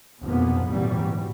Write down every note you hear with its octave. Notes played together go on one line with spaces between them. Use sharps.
F1 F#2 B2 F3 A#3 B3
G#1 D2 A#2 E3 F#3 G3
D2